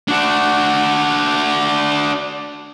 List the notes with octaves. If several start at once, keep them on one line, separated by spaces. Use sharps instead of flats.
D4 F#4